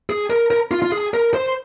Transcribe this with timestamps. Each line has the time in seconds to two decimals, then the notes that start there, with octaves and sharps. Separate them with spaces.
0.10 G#4
0.30 A#4
0.51 A#4
0.71 F4
0.82 F4
0.92 G#4
1.14 A#4
1.34 C5